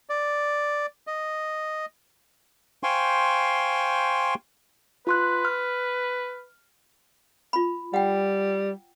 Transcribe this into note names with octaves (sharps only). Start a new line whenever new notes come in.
D5
D#5
C5 F5 G5 G#5 C6 C#6
F4 B4 C6 F#6
F6
F4 B5
G3 F#5 G5